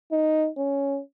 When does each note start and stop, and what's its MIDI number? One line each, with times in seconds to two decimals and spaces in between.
0.12 0.49 63
0.57 1.00 61